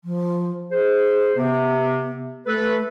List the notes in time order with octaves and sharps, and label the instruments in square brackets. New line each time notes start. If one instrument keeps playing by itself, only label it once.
[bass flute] F3
[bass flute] G#4 [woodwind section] C5
[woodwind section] C3 [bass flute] B3
[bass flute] A3 [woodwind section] A4 B4